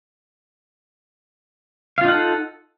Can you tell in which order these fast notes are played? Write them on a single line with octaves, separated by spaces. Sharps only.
F5 F4 D#4 F#5 A4